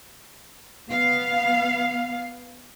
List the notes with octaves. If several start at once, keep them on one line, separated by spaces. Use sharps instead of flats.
B3 F5